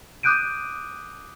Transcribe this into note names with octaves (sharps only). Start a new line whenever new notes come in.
D6 D#6 F#6 G6 D7 D#7